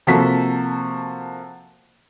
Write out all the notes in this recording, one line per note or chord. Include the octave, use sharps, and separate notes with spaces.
C3 F3 A#3 F#4 A4 B6